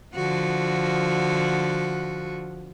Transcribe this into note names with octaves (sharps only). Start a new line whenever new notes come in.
D3 F3 F#4